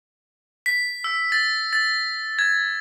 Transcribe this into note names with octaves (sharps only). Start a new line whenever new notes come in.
B6
E6
A6
A6
G#6